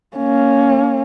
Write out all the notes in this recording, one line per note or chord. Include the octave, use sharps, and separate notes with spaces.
A#3 C#4